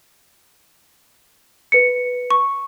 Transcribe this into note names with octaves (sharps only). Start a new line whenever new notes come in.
B4 C#7
C#6